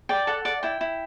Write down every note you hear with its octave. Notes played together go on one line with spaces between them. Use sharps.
D5 G5
A4 F#5
D5 F#5
E4 G5
E4